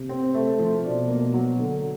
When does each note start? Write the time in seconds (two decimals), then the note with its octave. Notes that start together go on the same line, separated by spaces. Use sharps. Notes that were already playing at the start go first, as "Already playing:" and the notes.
Already playing: C3
0.09 C4
0.34 A3
0.59 F3
0.83 B2 D4
1.09 A#3
1.34 F#3
1.59 D3